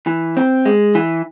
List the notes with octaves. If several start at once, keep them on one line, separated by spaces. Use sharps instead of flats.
E3
C4
G#3
E3